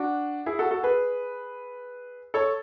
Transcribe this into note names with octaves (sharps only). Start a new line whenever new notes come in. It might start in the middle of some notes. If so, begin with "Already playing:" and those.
Already playing: D4 F#4
E4 G#4
F#4 A4
F#4 A4
G#4 B4
A4 C#5